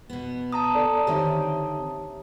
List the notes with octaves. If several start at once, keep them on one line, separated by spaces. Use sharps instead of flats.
B2 B3
A5 A#5 D#6
A4 D5
D3 D#3 C4 G4 C#5 E5